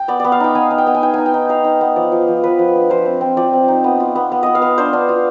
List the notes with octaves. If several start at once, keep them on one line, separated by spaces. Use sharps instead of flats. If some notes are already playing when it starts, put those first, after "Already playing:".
Already playing: G5
B3 D5
B3 D5
F5
D#4 G5
B3 G#5
D#4
G5
B3
G#5
D#4 G5
D#4 G#5
G5
D#4
D#4 F5
D#4
B3
F3 D5
F3
F3
F3 B4
F3
D4
F3 C5
C4
C4
F3 D5
C4
D#4
B3
F4
B3
B3
B3 D#5
F5
B3
D4 C5
D4
F4